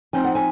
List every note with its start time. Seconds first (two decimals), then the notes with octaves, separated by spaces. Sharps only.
0.13 F3 C4 D#4 G#5
0.24 F#5
0.35 G#5